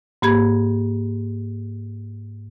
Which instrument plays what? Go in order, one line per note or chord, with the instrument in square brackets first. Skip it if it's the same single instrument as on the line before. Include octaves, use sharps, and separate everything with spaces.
[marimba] G#2 A#3 G4 B5 G#6